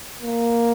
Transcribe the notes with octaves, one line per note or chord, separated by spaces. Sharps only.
A#3